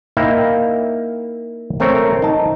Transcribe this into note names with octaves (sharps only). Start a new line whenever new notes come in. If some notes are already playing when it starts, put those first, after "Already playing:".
A#3 D#4 E4 E5 F5 G5
A3 C4 A#4 C#5
D#4 A5